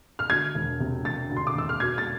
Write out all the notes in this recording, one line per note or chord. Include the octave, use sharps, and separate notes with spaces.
F6
D2 G#6
E1
C3
E1 A6
D2
C6
D6
E1 E6
F6
B2 G#6
A6